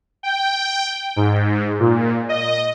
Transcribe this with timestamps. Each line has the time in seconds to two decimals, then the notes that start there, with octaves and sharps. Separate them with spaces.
0.23 G5
1.16 G#2
1.80 A#2
2.29 D#5